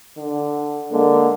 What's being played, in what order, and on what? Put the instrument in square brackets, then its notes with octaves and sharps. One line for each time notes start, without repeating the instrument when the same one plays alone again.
[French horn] D3
[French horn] D3 [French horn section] G#3 A#3